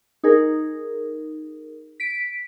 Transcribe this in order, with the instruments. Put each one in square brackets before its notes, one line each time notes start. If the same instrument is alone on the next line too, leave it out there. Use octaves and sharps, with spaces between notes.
[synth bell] D#4 G#4 A#4
B6 D7